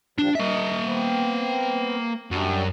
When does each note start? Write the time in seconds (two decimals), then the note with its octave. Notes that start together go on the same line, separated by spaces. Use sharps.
0.18 A#2 F3 G3 D4
0.35 A#3 D#5 E5
0.84 B3 C4
2.31 F#2 G3 D4